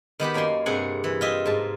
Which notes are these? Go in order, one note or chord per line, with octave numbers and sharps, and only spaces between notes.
D#3 B3 G4 B4
F#2 A#3 D5 G#5 C6
G2 C3 G#4 F#5 G#5 C6
E3
F4 D#5 E5 G5
G#2 A5